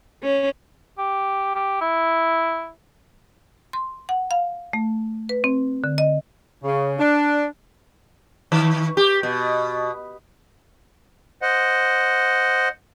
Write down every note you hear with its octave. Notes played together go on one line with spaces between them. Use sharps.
C#4
G4
G4
E4
C6
F#5
F5
A3
B4
C4
D3
D#5
C#3
D4
D#3
G4
B2
C5 D#5 F#5